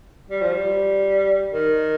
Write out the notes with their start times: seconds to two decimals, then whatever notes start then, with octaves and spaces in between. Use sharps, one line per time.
0.30 G3
0.41 F3
0.52 G3
1.52 D#3